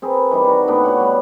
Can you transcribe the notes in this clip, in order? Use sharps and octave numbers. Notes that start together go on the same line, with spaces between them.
C4 G#4 A#4 B4
E3 G3 D#4
D#3 F#4
A2 B3 D4 G5
F#4 C#5 F#5
G3